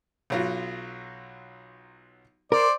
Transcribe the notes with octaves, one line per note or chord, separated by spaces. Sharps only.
B1 F#3 F4
A#4 C5 D5